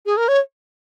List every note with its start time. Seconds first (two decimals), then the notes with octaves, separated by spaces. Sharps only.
0.06 G#4
0.17 A#4
0.28 C#5